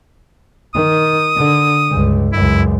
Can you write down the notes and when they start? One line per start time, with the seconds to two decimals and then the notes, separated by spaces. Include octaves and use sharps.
0.74 D#3 D#6
1.36 D3
1.88 C#2 G2
2.32 C#2 F#2 E4